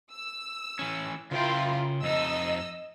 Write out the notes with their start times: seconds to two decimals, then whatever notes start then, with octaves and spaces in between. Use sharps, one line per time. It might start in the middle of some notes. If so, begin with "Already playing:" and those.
0.12 E6
0.79 E3 C#4
1.31 C#3 E4 F4 A#4 G5
2.03 F2 D#4 D#5 E6